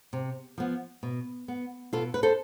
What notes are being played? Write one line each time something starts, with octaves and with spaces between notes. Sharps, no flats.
C3
F3 B3
B2
B3
B2 F4 A4
B4
A4 C5